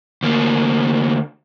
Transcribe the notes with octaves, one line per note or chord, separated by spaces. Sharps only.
D2 A#3